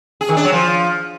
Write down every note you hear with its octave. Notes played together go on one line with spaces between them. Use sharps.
G#4
D#3
D4
F#3
F3